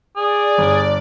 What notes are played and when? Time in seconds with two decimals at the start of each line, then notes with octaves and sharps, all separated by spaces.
0.16 G#4 D5
0.58 G1